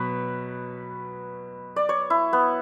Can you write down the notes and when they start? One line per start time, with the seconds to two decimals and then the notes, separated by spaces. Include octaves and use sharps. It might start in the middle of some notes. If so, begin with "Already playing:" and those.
Already playing: B2 F#3 B4 C#5
1.76 D5
1.89 C#5
2.10 E4
2.33 B3